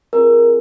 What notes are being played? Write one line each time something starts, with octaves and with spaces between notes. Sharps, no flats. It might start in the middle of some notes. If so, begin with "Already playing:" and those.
C4 F4 G#4 A#4